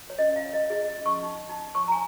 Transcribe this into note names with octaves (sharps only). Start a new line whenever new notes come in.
C#5
C#4 D#5
F5
C#5
D#5
G#4 D#5
D#5
C#4
C#6
D#4
D#4
C#5 C#6
A#5
G#5